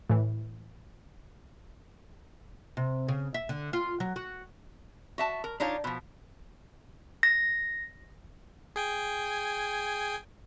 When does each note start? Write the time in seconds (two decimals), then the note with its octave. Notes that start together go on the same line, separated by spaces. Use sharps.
0.10 A2 E3
2.77 C3
3.08 C#3
3.34 E5
3.49 D3
3.73 F4
4.00 F#3
4.16 F#4
5.18 F#4 E5 A5
5.44 A#4
5.60 D4 D#4 F4 C#5 F5
5.84 B2 F3
7.23 A#6
8.76 G#4 G5 G#5